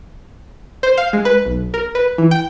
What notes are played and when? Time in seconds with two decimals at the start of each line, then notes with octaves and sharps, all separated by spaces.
0.83 C5
0.97 F5
1.13 G#3
1.25 B4
1.46 B1
1.74 A#4
1.95 B4
2.18 E3
2.31 G5